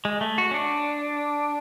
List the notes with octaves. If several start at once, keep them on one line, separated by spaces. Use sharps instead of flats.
G#3
A3
F#4
C#4
D4